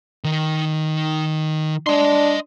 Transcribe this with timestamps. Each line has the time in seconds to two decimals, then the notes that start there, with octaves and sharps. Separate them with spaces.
0.24 D#3 D#4
1.87 D4 D#5 C6